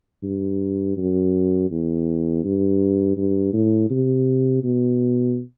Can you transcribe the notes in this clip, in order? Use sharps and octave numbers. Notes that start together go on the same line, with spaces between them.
G2
F#2
E2
G2
G2
A2
C3
B2